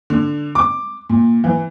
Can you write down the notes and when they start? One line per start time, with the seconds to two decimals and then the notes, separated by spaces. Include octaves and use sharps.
0.10 D3
0.55 D6
1.09 A#2
1.44 E3